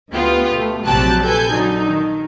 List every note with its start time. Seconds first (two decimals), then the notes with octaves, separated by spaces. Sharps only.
0.11 D2 B3 F4 G4
0.52 B2 A3
0.85 A#1 C3 F#3 G5 A5 F#6
1.23 A4 B4 G#5 G6
1.52 D3 F#3 D#4
1.89 D#3